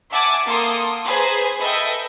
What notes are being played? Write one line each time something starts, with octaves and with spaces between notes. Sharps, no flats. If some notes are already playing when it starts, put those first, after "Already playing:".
E5 F#5 G#5 A5 D6
A#3 A4 C6 D#6
G#4 B4 C5 G#5 A#5
A4 B4 D#5 E5 G5